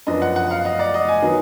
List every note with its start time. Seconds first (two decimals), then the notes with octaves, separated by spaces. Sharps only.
0.07 F#2 F3 B3 D4 D#5
0.22 F#5
0.36 F#5
0.51 F5
0.65 D#5
0.79 D5
0.94 D#5
1.09 G#5
1.23 D#3 F#3 B3